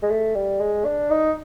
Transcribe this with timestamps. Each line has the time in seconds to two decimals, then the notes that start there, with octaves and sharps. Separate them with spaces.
0.03 G#3
0.10 A3
0.35 G3
0.60 G#3
0.85 D4
1.10 D#4